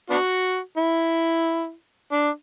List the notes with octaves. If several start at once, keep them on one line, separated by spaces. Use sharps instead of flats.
B3 D4 F#4
E4
D4